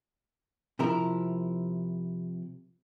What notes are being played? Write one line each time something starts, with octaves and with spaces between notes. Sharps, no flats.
C3 F3 E4 A#4